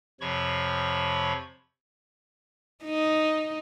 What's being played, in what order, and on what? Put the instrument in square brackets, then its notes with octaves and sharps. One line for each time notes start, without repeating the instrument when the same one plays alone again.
[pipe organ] F2 C3 F3 C#5 B5 C#6
[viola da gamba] D#4